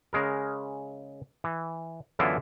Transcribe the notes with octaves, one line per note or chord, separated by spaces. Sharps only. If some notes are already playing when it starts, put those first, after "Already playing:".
C#3 G#3 A#4
E3
F#2 D3 E3 B3 E4 F4